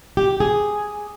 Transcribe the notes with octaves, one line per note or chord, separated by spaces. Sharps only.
G4
G#4